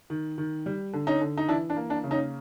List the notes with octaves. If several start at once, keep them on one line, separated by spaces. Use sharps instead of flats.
D#3
D#3
G3
D3
C#4 D#4
D3
D#4
E3 D4 E4
D4
A#3
D4
C#3
C#4 D#4